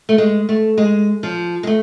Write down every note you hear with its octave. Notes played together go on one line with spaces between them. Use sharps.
A3
G#3
A3
G#3
F3
G#3
A3